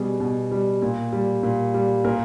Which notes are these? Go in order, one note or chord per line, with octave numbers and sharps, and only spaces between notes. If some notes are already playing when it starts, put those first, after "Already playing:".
Already playing: B2 G3 G#4
B2
G3
A#2
G3
A#2
G3
A#2 A#4